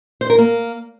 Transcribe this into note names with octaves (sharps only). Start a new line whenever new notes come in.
C5
A#4
A#3